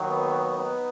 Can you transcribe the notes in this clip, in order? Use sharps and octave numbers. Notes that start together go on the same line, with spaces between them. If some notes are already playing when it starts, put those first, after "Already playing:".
Already playing: D#2 D#3 F#3
B3
B3 D#4